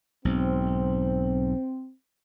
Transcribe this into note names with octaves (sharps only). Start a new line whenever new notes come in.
B1 G#2 C4